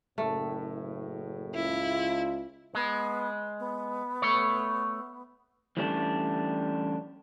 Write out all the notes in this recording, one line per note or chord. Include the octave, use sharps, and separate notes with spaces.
F#1 A2 A3
C#2 E4 F4
G#3 B3
B3
A3 C#5
E3 G3 A3 C#4 D4